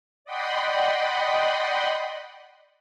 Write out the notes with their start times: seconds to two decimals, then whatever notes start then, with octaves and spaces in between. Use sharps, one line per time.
0.25 D5 D#5 F#5 G5 B5 C6